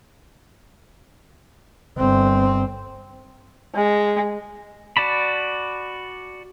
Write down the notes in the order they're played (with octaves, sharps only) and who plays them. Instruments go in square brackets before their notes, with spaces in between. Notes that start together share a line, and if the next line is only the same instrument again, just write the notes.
[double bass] G1 C4
[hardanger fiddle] G#3
[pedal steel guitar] F#4 D5 A5 B5